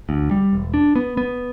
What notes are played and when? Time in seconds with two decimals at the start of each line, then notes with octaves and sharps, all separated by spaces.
0.09 D2
0.31 G3
0.53 E1
0.74 D4
0.96 B3
1.17 B3